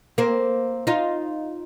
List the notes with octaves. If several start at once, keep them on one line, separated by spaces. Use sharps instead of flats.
A#3 C4
D#4 F4